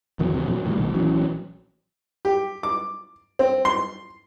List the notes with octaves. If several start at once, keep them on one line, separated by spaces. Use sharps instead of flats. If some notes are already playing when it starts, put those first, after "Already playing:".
D#1 E2 D#3 F#3
D#2 C3
A#2 F3 F#3
A2 D#3 G3
B1 A#2 D#3
A#1 E3 F#3 C#4
G4
D6
C4
C6